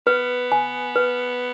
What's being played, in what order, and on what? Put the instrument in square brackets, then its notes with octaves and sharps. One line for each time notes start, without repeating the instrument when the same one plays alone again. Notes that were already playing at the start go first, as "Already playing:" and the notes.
[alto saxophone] B3 [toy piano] B4
[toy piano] G#5
B4